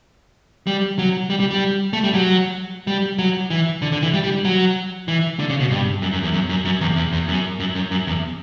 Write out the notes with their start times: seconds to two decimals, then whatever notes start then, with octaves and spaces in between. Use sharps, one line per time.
0.67 G3
0.99 F#3
1.30 G3
1.40 G3
1.51 G3
1.93 A3
2.04 G3
2.14 F#3
2.87 G3
3.19 F#3
3.50 E3
3.82 D3
3.92 D3
4.02 E3
4.14 G3
4.24 G3
4.45 F#3
5.08 E3
5.39 D3
5.50 C#3
5.60 B2
5.70 G2
6.02 F#2
6.13 F#2
6.23 E2
6.34 F#2
6.49 F#2
6.65 F#2
6.81 E2
6.96 E2
7.13 E2
7.28 F#2
7.60 F#2
7.75 F#2
7.91 F#2
8.07 E2